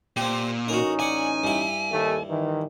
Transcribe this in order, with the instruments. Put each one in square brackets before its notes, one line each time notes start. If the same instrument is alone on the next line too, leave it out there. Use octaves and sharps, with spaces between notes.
[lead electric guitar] A#2 [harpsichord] C4 G4
[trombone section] A1 C#4 D#4 [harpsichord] F#4 A#4
[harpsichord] D5 F#5 [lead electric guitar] G#5
[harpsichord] G2 E4
[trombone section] D#2 A3
D#3 E3